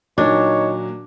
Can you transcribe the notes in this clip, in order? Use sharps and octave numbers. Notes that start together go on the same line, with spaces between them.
A#2 D#3 F#3 D4 D#4 C#5